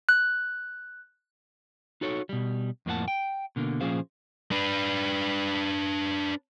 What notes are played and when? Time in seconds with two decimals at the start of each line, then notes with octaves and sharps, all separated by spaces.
0.09 F#6
2.01 D#4 F#4 A4 C#5
2.29 B2 G3
2.86 F2 A2 A#3 D4 F#5 A5
3.08 G5
3.56 B2 D3 A#3
3.81 A#2 F3 C#4 G#4 C5 F5
4.52 D4 B4